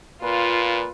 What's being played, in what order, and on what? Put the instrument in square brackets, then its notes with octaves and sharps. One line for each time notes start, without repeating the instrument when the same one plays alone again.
[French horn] A#2 [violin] F4 [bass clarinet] B4